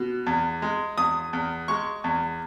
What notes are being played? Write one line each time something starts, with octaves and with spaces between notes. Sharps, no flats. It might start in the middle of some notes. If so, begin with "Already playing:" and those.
Already playing: B2
E2
G#3
E2 D#6
E2
G#3 C#6
E2